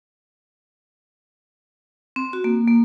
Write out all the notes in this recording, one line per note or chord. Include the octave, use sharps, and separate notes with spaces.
C4
F#4
A#3
A#3